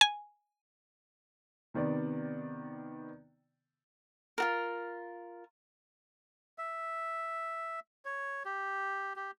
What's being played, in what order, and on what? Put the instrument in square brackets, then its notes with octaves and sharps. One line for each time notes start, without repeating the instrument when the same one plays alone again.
[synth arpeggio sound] G#5
[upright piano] C3 D#3 B3 D5
[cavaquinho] F4 F#4 A#4
[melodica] E5
C#5
G4
G4